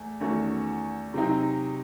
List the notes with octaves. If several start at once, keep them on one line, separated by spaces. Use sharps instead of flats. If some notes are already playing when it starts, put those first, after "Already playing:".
Already playing: E2 A3
E2 D#3 A3 C#4 F#4
C3 F#3 C4 D#4